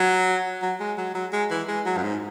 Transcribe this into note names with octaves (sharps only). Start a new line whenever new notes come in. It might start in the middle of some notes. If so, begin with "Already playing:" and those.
Already playing: F#3
F#3
G#3
F#3
F#3
G#3
E3
G#3
F#3
F#2
G#2